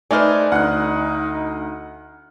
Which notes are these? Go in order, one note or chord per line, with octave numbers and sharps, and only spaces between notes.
A3 D#4 B4 C5 D5 G#5 F6
D2 D#4 F#5 F#6